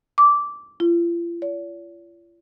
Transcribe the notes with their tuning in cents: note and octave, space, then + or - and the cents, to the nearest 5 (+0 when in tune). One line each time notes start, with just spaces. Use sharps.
D6 -10
F4 -40
D5 -45